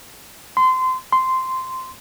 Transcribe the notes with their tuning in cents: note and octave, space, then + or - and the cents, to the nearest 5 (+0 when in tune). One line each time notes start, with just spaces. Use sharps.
C6 -25
C6 -10